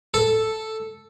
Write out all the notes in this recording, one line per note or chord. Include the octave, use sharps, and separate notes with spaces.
A4